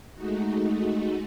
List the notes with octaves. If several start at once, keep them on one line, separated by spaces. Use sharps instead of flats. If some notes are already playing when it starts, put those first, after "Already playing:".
G#3 A3 D#4 F#4